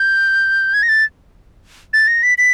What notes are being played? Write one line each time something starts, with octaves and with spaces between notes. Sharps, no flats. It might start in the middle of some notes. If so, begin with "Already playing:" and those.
Already playing: G6
G#6
A#6
A6
A6
A#6
B6
B6